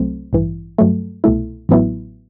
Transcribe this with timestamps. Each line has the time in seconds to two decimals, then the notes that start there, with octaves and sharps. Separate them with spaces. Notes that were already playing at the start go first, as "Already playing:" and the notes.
Already playing: C2 C3 F#3 A3 C4
0.33 A1 G2 E3
0.78 G2 F#3 A3
1.24 C2 B2 A3 E4
1.69 A1 A2 F#3 B3 E4